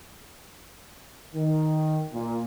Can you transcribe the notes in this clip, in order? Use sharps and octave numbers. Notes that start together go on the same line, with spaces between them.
D#3
A#2